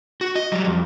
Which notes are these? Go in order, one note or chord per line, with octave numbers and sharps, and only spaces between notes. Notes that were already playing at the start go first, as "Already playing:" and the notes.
F#4
D#5
F#3 G3
F2